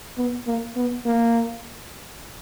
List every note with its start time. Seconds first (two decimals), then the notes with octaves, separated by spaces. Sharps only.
0.18 B3
0.47 A#3
0.76 B3
1.05 A#3